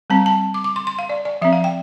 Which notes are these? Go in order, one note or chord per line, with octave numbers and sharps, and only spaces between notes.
G3 C4 A5
A5
D6
D6
C6
C6
F5
D5
D5
F3 C4 E5
F5
G5